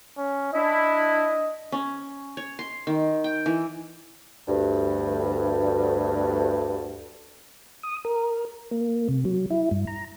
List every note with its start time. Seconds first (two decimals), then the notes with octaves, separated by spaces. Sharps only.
0.18 C#4
0.54 D4 E4 D#5
1.72 C#4
2.37 C#5
2.59 C6
2.87 D#3
3.24 G5
3.46 E3
4.48 D2 G2
7.83 D#6
8.05 A#4
8.71 A#3
9.09 C3
9.25 F#3
9.51 E4
9.71 G2
9.87 A#5